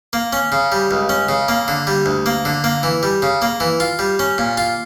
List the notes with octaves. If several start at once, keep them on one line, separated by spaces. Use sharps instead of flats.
A#3
C#4
C#3
G3
C#2
C#4
C#3
A#3
D3
G3
D2
A#3
D3
A#3
E3
G3
C#3
A#3
E3
F4
G3
C#4
A#2
F4